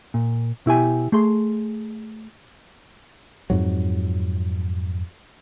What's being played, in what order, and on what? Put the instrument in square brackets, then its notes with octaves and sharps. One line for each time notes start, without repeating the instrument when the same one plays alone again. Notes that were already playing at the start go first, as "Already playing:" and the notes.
[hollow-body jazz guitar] A#2
B2 E4 G4 G#5
A3 G#4 C6
[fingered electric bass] F2 G#2 F#3